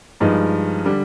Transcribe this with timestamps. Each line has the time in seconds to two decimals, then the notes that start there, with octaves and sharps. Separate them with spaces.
0.20 G2 F3 G#3 D#4
0.85 D3 G3